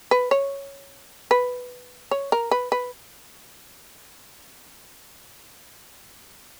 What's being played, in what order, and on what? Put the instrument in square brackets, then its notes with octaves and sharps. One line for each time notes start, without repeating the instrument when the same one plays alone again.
[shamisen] B4
C#5
B4
C#5
A#4
B4
B4